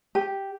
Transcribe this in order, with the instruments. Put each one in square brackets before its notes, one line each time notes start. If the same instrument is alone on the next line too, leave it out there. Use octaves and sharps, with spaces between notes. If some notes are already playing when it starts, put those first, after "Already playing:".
[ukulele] G4